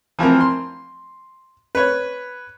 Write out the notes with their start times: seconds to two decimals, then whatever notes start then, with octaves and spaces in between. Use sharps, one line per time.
0.19 E3 F3 C4 A#4
0.40 C6
1.75 B4 C#5